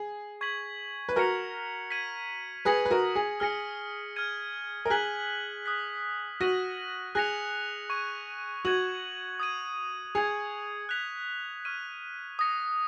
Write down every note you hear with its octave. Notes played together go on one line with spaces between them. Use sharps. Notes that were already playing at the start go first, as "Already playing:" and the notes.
Already playing: G#4
C#6 G#6 B6 F#7
B4
F#4 A#4 F6 G#6 C#7 F7
G#6 B6 D#7 F#7
G#4 B4 D#6 A#6 C#7 F#7
B4
F#4 A#4
G#4
G#4 F6 A#6 C#7
F6 G#6 D#7
A#4
G#4 F#6 B6 F#7
D#6 F#6 B6
F#4 F6 A#6 D#7 F#7
G#4 F#6 A#6 C#7 F7
C#6 G#6 D#7
F#4 G#6 D#7 F#7
D#6 G#6 D#7
G#4 G#6 C#7 F7
F#6 B6 F7
C#6 F6 G#6 D#7
D#6 A#6 C#7